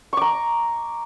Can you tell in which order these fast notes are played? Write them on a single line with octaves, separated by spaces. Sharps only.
C#6 D6 A#5